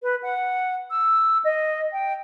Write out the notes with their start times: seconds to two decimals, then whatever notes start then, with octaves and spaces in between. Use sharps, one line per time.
0.03 B4
0.23 F#5
0.90 E6
1.44 D#5
1.92 G5